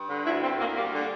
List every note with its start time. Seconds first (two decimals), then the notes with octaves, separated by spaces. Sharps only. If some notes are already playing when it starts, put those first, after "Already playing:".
Already playing: G2
0.09 D3
0.25 D2 E4
0.42 D2 C4
0.59 D2 A#3
0.75 G3 A#3
0.93 D3